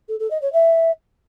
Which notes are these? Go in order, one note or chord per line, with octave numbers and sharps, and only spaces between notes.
A4
A4
D#5
C#5
E5